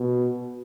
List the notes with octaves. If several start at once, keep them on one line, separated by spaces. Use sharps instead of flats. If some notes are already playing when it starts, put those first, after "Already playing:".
Already playing: B2